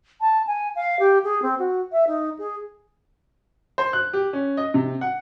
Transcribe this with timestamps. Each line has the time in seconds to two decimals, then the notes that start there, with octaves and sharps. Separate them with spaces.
0.21 A5
0.47 G#5
0.76 F5
1.00 G4
1.24 G#4
1.42 C4
1.59 F#4
1.92 E5
2.07 D#4
2.39 G#4
3.78 C5
3.93 F#6
4.13 G4
4.33 C#4
4.57 D#5
4.74 C3
5.01 F#5